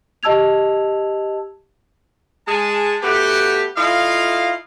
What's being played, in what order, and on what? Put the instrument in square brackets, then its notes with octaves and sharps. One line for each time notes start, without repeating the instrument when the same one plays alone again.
[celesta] G4 D#5 A5 E6 G#6 F7
[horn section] G#3 G#4 A5
A3 B3 F#4 G4
E4 F4 A4 D#5 F5